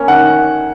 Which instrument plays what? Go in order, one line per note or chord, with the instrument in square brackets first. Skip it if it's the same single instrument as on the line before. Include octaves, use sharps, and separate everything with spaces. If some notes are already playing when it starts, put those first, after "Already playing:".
Already playing: [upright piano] A#3 C#4
D#3 F#5